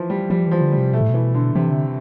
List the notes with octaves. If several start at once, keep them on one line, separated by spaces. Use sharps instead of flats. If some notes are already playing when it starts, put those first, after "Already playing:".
Already playing: E3 F3
G3
F3 G3
E3 F3
D3
G3
C3
B2 A3
A2
B2 E3
D3
C3 E3
D3